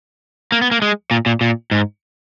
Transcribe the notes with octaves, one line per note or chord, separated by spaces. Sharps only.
A#3
B3
A#3
G#3
A#2
A#2
A#2
G#2